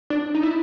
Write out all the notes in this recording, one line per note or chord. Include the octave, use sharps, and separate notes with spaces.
D4
D#4
E4